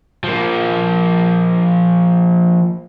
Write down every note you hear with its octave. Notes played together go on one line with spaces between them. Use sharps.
F3 A#3